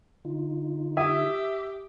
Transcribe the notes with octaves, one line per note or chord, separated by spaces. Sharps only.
D3 D#4 F4
G4 E5 G#5 D#6